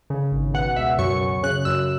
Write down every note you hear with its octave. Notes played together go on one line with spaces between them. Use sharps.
C#3
G#1
B2 F#5
C#2 E5
F#2 C#6
F#2
C#3 F#6
F#2 E6